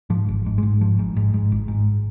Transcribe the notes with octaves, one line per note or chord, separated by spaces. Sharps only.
G#2 F3
G#1
G#2
G#3
G#2
G#1 F3
G#2
G#2
G#2
G#1
G#2